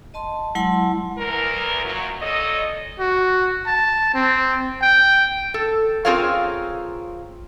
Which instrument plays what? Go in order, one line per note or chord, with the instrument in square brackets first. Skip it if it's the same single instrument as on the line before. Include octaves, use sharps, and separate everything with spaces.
[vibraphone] D#5 A5 C6
F#3 G#3 E4 F#5 A5 C6
[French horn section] D2 E3 A#4
F#2 A#2 F#3
A#2 A4 C#5 D#5
[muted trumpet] F#4
A5
C4
G5
[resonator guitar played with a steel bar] A4
C4 F4 G#4 A#4 C#5 F5